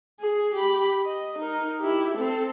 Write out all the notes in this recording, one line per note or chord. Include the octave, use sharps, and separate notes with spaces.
G#4
G4 B5
D#5
D#4 A#4
E4 G4
C4 A4